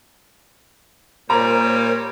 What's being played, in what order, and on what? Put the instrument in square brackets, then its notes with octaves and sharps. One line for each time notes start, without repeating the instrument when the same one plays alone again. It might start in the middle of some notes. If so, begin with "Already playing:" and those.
[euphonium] A#2 [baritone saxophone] G3 [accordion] A#4 C5 C#5 [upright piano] A#5